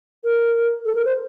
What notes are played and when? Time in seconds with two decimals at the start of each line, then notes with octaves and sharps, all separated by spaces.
0.24 A#4
0.85 A4
0.95 A#4
1.05 C5